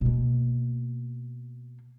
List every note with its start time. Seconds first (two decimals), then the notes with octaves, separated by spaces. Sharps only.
0.01 B2 A#3